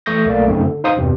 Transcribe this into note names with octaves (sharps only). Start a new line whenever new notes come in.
E3 A3 C#6 D#6 G6 A#6
B1 A3 A#3 D5
F#2 C#3 A3 C4 D#4
D3
D#4 C5 F5 D#6
E2 G2 C3